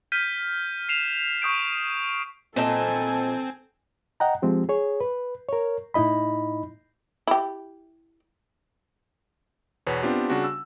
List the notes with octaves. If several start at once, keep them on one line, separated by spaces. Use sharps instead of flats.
F6 G6 B6 D#7
C7 E7 F7
C#6 D#6 G6 D7
A#2 C4 A4 D#5 G#5 A5
D#5 F#5 G5 A#5
F3 G#3 C4 G4
G#4 C#5
B4
A#4 C#5
A2 D#4 E4 D#5 B5
E4 G4
E2 B2 B4 C#5
B3 C4 D4 F4 G4
C#3 G3 D4 F#4
E6